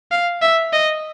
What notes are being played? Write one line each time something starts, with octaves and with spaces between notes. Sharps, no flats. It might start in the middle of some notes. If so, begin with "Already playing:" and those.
F5
E5
D#5